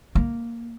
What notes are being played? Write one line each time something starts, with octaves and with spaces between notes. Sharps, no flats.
A#3